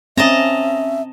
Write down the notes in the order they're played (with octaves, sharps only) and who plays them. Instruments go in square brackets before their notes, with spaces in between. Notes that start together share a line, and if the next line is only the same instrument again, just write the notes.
[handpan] C4 [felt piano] C#4 [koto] D#5 A5 A#5 [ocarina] E5